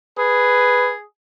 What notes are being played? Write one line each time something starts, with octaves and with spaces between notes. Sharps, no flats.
G#4 B4